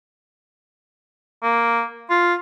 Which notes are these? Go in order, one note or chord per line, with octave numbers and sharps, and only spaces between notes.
A#3
F4